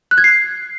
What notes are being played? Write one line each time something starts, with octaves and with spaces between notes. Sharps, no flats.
F#6
G#6
C7